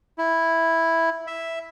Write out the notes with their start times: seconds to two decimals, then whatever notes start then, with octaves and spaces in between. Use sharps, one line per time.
0.18 E4
1.27 E5